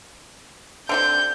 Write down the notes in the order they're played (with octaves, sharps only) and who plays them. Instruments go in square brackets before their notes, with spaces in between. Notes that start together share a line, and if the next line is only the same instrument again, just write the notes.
[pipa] D3 C4 G4 [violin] G6